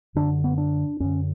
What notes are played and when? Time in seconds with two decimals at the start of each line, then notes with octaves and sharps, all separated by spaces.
0.15 F#2 D3 D4
0.44 B3
0.58 D4
1.00 F#2 D3 C#4